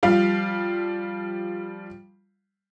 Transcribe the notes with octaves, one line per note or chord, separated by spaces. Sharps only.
F3 G3 F5